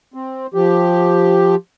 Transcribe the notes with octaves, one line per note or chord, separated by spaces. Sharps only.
C4
F3 G4